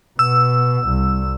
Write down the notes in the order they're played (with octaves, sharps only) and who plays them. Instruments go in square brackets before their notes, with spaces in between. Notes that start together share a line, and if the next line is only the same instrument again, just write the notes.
[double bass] B2 [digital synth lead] E6
[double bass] C2